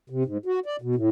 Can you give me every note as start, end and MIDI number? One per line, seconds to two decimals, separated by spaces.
0.10 0.23 48
0.25 0.38 44
0.46 0.60 66
0.66 0.76 74
0.82 0.95 47
0.95 1.10 45